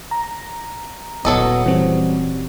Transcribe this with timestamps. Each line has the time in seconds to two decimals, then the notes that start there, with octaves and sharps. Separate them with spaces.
0.11 A#5
1.25 D#1 F#3 B3 C#4 A4 D#5
1.66 E3 G3 C4